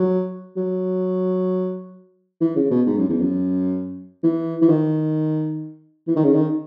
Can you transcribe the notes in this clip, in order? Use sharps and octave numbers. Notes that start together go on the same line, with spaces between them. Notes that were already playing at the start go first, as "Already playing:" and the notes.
Already playing: F#3
F#3
E3
C#3
B2
G#2
F#2
E2
F#2
E3
E3
D#3
E3
D#3
C#3
D#3